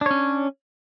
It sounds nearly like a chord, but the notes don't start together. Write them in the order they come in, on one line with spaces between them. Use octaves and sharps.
D4 C#5 C#4